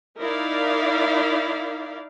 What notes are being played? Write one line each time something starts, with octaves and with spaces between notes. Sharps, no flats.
D#4 E4 A#4 D5 F5